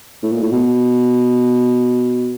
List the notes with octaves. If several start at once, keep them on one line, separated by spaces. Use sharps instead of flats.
A2
A#2
A2
B2